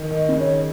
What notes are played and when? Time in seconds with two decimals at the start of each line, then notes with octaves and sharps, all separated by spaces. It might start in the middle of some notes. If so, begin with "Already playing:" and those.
Already playing: D#3
0.11 D#3
0.17 D#5
0.29 C#3
0.39 C#5
0.46 D#3